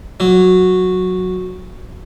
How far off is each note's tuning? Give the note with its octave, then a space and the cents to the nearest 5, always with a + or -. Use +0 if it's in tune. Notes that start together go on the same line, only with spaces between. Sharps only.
F#3 -10